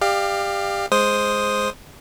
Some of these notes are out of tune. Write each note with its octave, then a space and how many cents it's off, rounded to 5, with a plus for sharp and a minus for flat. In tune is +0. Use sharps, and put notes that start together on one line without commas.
G4 +20 D5 +40 F5 +0
G#3 +0 C5 +0 D#6 +0